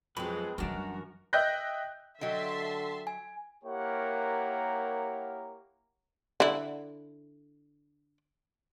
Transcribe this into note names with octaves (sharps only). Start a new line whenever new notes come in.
F2 F#3 G#3 C4 G#4 B4 B5
F#2 E3 G3 D4 F#4 A#4
D#5 E5 G5 F#6 G6 A#6
D3 F#3 D#5 E5 G5 A5 C6
G#5
A#3 E4 G4 A#4 C#5 F#5
D3 E4